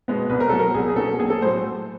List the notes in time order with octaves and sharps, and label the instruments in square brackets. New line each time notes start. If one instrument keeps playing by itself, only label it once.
[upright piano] B2 G#3 B3
C2 B4
A#4
B2 F#3 A4
A#4
C2 G#4
G#4
B2 F#3 A#3 C#4 A4
A#1 G#4
A4
A2 C5
F#3